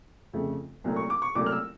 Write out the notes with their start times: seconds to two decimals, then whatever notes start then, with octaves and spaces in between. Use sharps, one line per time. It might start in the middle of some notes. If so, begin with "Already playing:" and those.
0.33 F1 F2 C#3 F3 A3
0.84 C2 A#2 F#3 A3
0.96 C#6
1.10 D6
1.22 C#6
1.35 C2 A#2 F#3 A3 D6
1.46 F6
1.52 E6